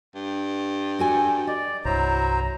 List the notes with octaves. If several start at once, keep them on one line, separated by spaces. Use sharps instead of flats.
G2
F#4 A4 G#5
D5 D#5
C2 G2 F#3 E4 C5 A#5